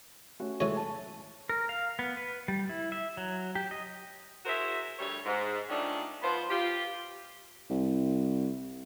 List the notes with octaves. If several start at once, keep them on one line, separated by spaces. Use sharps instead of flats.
A3 C#4 F#4
E3 G#3 A4 C#5
A5
A#4
F5
B3
B4
G3
E4
E5
F#3
G4
D#5
E4 F#4 G#4 A#4 C5 E5
D2 G3 A3 C#5
G#2
A#2 D#3 A3 C#4 D4
F3 B3 C5
F4 G4
C2